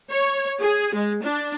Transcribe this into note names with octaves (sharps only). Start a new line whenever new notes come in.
C#5
G#4
G#3
D4